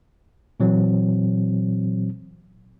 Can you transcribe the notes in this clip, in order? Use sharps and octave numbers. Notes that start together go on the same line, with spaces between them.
A#2 E3 F#3 C4